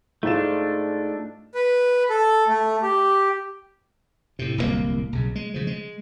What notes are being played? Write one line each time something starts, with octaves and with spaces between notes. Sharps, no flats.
G#2 A3 D4 F4 E7
B4
A4
A3
G4
A2 C3
D1 C2 C#3 A#3
B1 C#3
G#3
C#3 F3
G#3